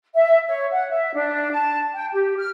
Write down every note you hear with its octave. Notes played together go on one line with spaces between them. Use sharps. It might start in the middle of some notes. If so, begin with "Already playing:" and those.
E5
C#5
F#5
E5
D4
A5
G5
G4
F6